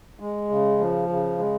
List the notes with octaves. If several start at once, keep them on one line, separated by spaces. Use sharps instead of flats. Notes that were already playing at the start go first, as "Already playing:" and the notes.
G#3
C#3
F3
C#3
G#3